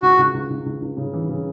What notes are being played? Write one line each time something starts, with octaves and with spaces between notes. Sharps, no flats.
C#2 F#4
C#2
C#2
C#2
C#2
C#2
C#3
E3
C#3